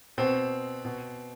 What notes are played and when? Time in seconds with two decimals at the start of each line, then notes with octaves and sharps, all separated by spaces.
0.18 B2 C4
0.85 B2